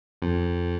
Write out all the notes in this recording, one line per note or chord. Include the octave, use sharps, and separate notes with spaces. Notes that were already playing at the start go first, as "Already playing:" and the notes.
F2